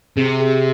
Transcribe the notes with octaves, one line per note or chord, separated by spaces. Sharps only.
C3 G#4
G#4